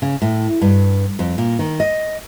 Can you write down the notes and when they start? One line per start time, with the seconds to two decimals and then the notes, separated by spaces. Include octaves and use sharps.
0.02 C#3
0.22 A2
0.62 G2
1.19 F2
1.38 A#2
1.59 D#3
1.80 D#5